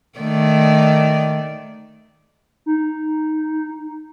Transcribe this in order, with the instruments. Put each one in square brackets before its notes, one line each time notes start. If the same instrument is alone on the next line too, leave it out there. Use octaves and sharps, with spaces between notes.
[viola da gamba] D#3 A3 D5
[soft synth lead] D#4